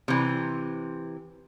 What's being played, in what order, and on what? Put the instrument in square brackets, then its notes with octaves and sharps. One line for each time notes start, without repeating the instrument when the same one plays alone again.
[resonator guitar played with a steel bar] C3 E3